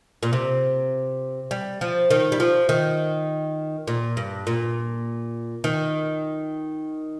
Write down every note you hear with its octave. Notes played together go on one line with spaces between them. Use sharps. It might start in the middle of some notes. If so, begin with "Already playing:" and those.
A#2
C3
G3
F3
D#3
G3
F3
D#3
A#2
G2
A#2
D#3